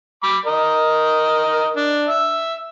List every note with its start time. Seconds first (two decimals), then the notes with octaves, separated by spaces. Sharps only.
0.23 B5 D6
0.46 A#4 D#5
1.76 D4
2.07 E5